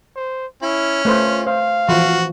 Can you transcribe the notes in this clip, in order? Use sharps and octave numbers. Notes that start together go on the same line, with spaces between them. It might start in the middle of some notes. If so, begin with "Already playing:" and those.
C5
C#4 E4
A3 F4 B4 C5
C5 F5
E3 F3 F#4